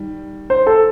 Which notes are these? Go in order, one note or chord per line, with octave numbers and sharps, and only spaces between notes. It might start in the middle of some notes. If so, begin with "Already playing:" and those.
Already playing: D#3 G3
C5
A4